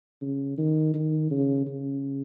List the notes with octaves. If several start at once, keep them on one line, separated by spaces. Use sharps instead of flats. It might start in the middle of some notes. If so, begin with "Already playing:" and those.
C#3
D#3
D#3
C#3
C#3